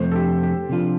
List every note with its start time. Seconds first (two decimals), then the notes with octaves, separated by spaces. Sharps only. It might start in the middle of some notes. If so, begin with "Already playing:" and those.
Already playing: F2 C3 A3 C5
0.12 A4
0.15 G4
0.43 G4
0.69 C3 F3 D4 F4